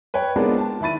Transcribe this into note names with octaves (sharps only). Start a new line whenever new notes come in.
B4 C#5 G5
G#3 B3 D4 F4 A#4 C5
A5
D#3 E4 B5 A6 D#7